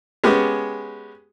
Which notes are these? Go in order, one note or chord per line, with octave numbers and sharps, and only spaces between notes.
G#3 B3 C#4 G4